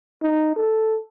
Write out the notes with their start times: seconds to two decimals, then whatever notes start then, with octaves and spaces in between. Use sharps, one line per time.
0.23 D#4
0.56 A4